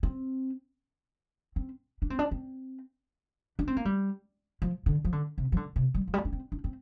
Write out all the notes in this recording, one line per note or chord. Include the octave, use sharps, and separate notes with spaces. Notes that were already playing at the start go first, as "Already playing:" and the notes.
C4
C4
D4
C4
D4
C4
D4
C4
A#3
G3
F3
D3
F3
D3
C3
F3
D3
C3
G3
F3
G3
D4
C4
D4
C4